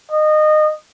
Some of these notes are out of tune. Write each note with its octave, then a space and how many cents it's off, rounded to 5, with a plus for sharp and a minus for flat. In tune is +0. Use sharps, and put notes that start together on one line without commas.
D#5 -20